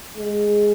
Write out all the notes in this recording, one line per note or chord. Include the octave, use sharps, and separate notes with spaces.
G#3